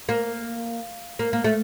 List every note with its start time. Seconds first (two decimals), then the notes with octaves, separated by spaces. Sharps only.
0.09 A#3
1.19 A#3
1.33 A#3
1.44 A3